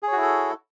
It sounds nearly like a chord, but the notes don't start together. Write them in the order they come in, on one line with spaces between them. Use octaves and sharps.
G#4 C#5 F#4 E4 A4